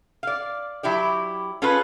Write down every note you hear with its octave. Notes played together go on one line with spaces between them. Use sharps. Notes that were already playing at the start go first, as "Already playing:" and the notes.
D5 F5
F#3 E4 G4 D5
C#4 F4 G#4 A4 B4